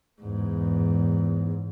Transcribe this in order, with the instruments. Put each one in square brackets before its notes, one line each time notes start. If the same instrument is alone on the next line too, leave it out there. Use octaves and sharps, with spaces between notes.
[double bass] E2 G#2